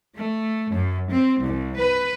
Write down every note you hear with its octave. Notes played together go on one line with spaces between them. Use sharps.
A3
F#2
C4
C2
B4